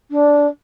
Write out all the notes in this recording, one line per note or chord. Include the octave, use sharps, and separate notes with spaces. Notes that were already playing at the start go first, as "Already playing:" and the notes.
D4